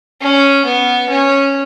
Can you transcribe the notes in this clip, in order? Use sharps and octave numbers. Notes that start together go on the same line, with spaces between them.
C#4
B3
C#4